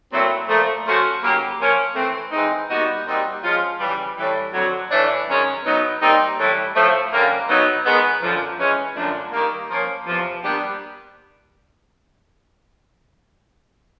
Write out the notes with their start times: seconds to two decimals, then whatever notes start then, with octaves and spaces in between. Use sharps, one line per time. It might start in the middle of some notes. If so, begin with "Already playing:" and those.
0.10 A#2 F#3 A3 C4 E4
0.48 A#2 F3 A3
0.85 F3 A3 C#4 F#4
1.21 C#3 F#3 A#3 D#4 G4
1.58 F3 A#3 C#4
1.95 E3 A3 C4
2.32 E3 G#3 C4 D#4
2.69 A#2 G3 B3 D#4 F#4
3.05 A#2 G3 C4 D#4 F#4
3.42 F3 G#3 C#4 F4
3.79 C#3 E3 G3
4.16 A2 E3 G3
4.53 F2 D3 F#3
4.90 A2 E3 A3 D4
5.27 F#2 D#3 G#3 C#4
5.63 B2 F#3 B3 D#4
6.01 A#2 G3 C4 D#4
6.37 A2 E3 G3
6.75 A2 F3 A3
7.12 F#2 D3 G3 A#3
7.48 B2 F#3 B3 D#4
7.85 D#3 G#3 B3
8.21 F#2 D3 F3
8.59 E3 G#3 C#4
8.95 F#2 D3 F3 A3 D4
9.32 D#3 G3 A#3
9.69 F3 A#3 C#4
10.06 E2 C3 F3
10.43 A#2 G3 B3 D4 G4